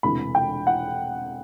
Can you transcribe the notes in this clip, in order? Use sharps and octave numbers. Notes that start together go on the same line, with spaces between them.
E1 D2 C3 E3 B5
G5
F#5